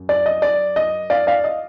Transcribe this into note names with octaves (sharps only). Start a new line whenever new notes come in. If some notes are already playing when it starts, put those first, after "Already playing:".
Already playing: F#2
D5
D#5
D5
D#5
D5 F5
D5 F5
D#5